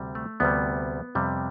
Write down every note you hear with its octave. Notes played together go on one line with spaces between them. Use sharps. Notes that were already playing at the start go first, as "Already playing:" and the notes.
Already playing: D2 C3 G3
A3
D2 C3 G3 B3
F2 C3 G3